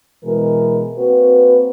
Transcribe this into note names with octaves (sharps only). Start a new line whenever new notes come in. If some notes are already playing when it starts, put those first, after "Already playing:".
B2 E3 G#3 A#4
A#3 C4 F#4 B4